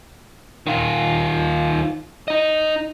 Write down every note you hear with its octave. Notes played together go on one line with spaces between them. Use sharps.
D#3 F4
D#4 D#5